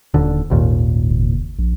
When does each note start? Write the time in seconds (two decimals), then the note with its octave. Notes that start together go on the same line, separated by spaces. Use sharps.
0.14 D#1 D3
0.50 G#1 D#2 A#2
1.11 F#1
1.59 A#1